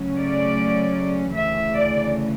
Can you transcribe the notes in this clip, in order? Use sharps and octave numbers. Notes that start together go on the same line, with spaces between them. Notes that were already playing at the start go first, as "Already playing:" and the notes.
Already playing: C#3 F#3 A3 C#4
D5
D2 C#3 E3 A3 E5
D5